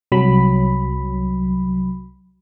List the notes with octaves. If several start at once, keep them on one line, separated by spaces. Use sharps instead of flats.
C2 F#3 B5